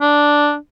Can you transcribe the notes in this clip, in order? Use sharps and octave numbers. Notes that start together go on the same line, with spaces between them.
D4